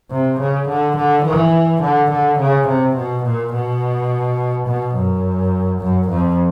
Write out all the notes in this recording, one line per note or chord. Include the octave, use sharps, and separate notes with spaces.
C3
C#3
D3
D3
E3
D3
D3
C#3
C3
B2
A#2
B2
B2
F#2
F#2
F2